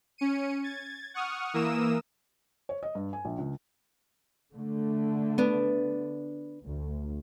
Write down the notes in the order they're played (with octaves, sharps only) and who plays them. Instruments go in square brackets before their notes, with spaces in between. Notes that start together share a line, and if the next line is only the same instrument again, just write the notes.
[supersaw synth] C#4 C#7 D#7
G#6 A6
F#5 C#6 D#6 F6
E3 A#3 A#4 D#6 E6 E7
[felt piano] C#5
D#5
G2
G#5
A#1
C#2
[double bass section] D3 A3
[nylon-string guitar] B3 D4
[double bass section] D2